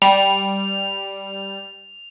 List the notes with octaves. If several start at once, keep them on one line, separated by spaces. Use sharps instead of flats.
G3 F7